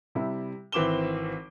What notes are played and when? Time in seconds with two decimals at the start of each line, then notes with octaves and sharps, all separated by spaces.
0.15 C3 G3 E4
0.72 G#1 E3 C4 D6 E7 G7